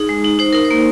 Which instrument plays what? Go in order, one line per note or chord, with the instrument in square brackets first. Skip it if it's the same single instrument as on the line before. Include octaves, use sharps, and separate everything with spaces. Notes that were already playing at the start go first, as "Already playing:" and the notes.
Already playing: [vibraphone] D#4 G#4
G#3
D#4
D#4 C5
D#4 A#4
C5
A#3